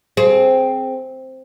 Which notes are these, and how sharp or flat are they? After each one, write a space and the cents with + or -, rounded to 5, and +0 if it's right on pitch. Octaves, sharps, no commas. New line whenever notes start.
C4 +0 G#4 +25